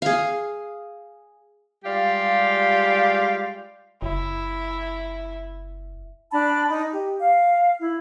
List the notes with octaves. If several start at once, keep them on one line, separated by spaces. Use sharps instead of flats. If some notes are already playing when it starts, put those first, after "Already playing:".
G#4 F5
G3 G#3 F4 G4 D5 F5
F#1 E4
D4 A5 B5
D#4
G4
F5
E4